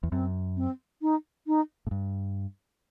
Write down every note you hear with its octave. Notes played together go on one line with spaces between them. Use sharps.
E2
F#2 C4
C4
D#4
D#4
A2
G2